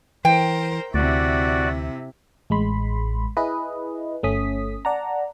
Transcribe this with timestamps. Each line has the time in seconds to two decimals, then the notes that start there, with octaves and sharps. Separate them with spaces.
0.25 E3 A#4 C5 G5
0.94 D2 C3 E4 F#4 D5
2.50 A1 G#3 B5 C6
3.37 E4 G#4 B4 D#5
4.23 G1 A3 C#4 D#6 B6
4.85 D5 F#5 A5 A#5